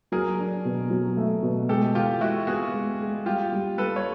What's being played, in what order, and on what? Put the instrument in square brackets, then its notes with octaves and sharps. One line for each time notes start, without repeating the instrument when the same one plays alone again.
[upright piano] F#3 [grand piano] G#4 A#4
[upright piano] D4
B2
F#3
A3
B2
[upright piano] G#3 [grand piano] G4 A4
[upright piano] E3 [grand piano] F4 G4
[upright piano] G#3 [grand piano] E4 F#4
[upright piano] B3 [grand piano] F#4 G#4
[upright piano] G#3
G#3
[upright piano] G3 [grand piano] F4 G4
[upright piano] G3
[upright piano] G3 [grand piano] A4 B4
[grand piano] C#5